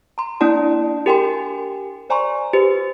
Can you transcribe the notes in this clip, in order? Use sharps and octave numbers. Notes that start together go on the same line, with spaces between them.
A#5 C6
A#3 D4 E4 D5 A5 C6
G4 A#4 G5 G#5 C6
C5 D5 G#5 A#5 C6 C#6
G4 B4 C5